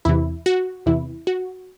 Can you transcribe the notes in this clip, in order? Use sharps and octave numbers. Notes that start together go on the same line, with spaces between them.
E2 C3 E3 E4
F#4
E2 C3 E3 E4
F#4